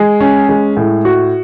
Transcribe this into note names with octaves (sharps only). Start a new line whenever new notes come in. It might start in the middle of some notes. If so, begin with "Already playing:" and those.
Already playing: G#3
C#4
G#3
A2
F#4